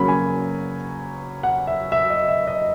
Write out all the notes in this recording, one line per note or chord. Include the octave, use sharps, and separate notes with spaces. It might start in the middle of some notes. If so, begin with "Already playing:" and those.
Already playing: C#3 F#3 A#3 C#4 B5
G#5
F#5
E5
E5
D#5
E5
D#5